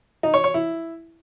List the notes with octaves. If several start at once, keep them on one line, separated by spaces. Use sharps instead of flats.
D#4
C#5
C#5
E4